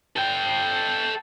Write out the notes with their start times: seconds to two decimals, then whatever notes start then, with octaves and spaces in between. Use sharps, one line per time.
0.16 A4 G5